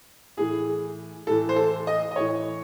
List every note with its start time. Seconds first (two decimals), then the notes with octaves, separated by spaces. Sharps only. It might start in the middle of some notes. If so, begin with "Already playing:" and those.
0.37 A2 E3 G#4
1.27 A2 E3 A4
1.49 C5
1.56 A4
1.87 D#5
2.11 D#5
2.16 A2 E3 C#5